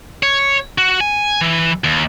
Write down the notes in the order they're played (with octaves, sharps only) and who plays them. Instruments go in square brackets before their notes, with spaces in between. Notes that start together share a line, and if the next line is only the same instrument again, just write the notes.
[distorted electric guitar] C#5
F#4
G#5
E3
D#2